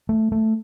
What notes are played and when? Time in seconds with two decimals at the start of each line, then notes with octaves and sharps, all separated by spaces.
0.09 A3
0.32 A3